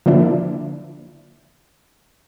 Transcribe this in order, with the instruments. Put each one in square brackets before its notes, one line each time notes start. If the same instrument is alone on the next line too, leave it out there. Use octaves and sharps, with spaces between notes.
[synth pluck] D3 F3 A#3 D4 E4